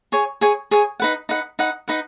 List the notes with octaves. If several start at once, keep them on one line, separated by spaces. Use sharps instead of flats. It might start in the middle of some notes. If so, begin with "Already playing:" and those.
G#4 C#5 G#5
G#4 C#5 G#5
G#4 C#5 G#5
D#4 B4 F#5
D#4 B4 F#5
D#4 B4 F#5
D#4 B4 F#5